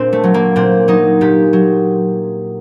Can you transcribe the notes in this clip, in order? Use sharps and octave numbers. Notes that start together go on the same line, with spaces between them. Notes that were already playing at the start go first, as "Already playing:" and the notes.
Already playing: A#2 C4 D4
A3
F#3
A#3
A#2 C4
F#3 D#4
A#2 G4
F#3